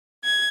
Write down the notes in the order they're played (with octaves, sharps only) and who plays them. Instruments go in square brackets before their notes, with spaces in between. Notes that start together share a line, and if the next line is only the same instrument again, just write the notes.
[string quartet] G#6